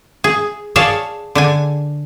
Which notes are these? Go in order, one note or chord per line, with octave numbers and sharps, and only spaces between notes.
G#4
G#4 A4 C#5 D5 F5 A5
D3 D4 G#5